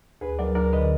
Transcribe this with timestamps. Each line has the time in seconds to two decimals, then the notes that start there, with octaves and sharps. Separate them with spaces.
0.21 D2 G#4 B4
0.39 F#3 A#4 D5
0.55 D2 A#4 D5
0.73 D3 B4 D#5